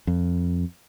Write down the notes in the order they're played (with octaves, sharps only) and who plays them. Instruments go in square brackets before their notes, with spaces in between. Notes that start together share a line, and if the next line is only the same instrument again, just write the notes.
[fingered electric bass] F2